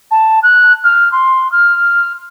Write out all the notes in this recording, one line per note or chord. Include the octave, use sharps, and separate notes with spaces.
A5
F#6
F6
C6
F6